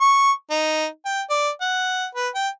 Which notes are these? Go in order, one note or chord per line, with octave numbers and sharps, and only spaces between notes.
C#6
D#4
G5
D5
F#5
B4
G5